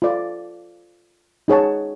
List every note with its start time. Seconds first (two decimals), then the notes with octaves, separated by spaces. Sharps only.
0.02 F4 A4 D5 F5
1.48 D#4 G#4 C#5 F#5 A5